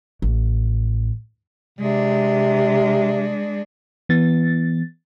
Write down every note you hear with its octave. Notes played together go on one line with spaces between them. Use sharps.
A1
C3 G#3 D4
E3 B3 A6